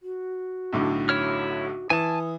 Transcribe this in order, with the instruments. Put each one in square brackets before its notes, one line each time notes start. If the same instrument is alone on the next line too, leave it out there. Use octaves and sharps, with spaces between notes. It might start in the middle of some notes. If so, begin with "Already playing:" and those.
[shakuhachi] F#4
[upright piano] B1 A2 D3
[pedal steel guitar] E4 C#5 F6
[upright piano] E3 [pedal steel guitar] G#5 A5 [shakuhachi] D#6